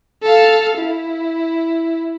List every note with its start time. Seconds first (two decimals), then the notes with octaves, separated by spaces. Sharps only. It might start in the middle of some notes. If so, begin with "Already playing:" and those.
0.23 A4 F5
0.78 E4